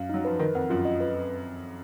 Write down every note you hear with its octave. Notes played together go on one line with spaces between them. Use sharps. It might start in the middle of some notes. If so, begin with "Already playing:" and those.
Already playing: F#2 F5
F#3 D#4
F3 B4
D#3 A#4
F2 F#5
F#2 F4
D#5
B4